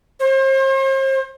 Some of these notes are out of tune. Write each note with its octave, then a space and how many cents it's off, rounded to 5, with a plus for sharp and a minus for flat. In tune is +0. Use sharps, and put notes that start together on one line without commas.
C5 +40